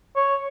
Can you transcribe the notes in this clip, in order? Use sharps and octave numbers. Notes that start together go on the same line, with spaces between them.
C#5